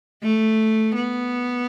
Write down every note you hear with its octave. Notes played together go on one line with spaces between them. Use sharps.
A3
B3